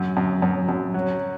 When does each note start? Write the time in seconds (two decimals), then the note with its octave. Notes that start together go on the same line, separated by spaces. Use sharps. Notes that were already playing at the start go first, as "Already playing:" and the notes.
Already playing: F#2
0.17 F#2
0.42 F#2
0.69 F#2
0.94 F#3